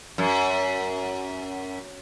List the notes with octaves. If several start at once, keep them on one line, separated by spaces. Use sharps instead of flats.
F#2